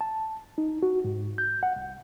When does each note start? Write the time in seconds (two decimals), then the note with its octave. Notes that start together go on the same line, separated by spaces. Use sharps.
0.01 A5
0.58 D#4
0.83 F#4
1.04 G#2
1.38 G6
1.63 F#5
1.76 C2